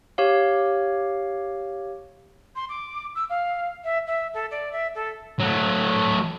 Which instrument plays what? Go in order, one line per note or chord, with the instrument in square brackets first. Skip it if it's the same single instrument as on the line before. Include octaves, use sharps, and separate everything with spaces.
[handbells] G4 C#5 F5
[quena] C6
D6
E6
F5
E5
E5
A4
D5
E5
A4
[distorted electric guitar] F#3 A3